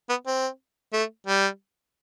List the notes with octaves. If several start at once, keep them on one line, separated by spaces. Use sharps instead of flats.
B3
C4
A3
G3